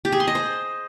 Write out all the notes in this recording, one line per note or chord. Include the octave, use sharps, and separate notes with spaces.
G4
G#4
C6
D#5
C5